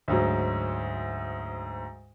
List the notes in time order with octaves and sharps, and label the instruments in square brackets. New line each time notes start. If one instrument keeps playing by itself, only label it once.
[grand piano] D2 G#2 F#3